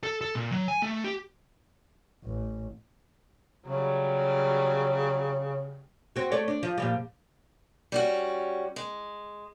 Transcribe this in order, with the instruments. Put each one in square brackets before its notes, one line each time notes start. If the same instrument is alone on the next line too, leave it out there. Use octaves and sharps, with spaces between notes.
[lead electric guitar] A4
A4
A#2
F#3
G#5
A3
G4
[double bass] A1
[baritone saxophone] C#3 [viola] F#3 G3
[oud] C4 F#4
A3 C#5 D5
D4
F3
A#2 F3 G3
[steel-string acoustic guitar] G3 C#4 F#4
G#3